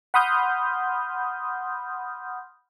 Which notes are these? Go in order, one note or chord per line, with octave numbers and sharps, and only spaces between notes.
F#5 B5 C6 D#6 F6 G6